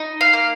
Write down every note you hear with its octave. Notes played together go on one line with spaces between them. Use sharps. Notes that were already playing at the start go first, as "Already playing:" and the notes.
Already playing: D#4
F5
A#3